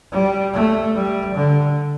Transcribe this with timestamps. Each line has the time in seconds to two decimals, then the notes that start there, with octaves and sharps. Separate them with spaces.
0.12 G3
0.53 A3
0.94 G3
1.35 D3